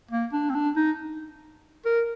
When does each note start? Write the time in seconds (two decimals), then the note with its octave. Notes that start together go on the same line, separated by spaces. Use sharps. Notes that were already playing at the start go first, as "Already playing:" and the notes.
0.11 A#3
0.33 D4
0.50 C4
0.55 D4
0.76 D#4
1.85 A#4